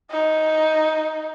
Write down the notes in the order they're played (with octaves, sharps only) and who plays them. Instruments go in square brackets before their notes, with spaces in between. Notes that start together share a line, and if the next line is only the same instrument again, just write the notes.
[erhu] D#4